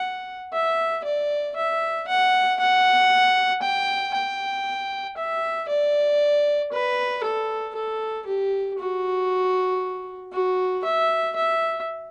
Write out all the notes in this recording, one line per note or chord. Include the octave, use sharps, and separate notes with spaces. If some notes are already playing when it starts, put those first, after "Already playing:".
Already playing: F#5
E5
D5
E5
F#5
F#5
G5
G5
E5
D5
B4
A4
A4
G4
F#4
F#4
E5
E5